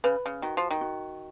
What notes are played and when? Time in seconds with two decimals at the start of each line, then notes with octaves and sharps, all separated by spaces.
0.04 C#3 B4
0.26 C#3
0.42 D#3 F#4
0.57 F3
0.71 D#3
0.81 F#4